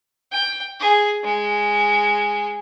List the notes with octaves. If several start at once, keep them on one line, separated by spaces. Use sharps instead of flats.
G5
G#4
G#3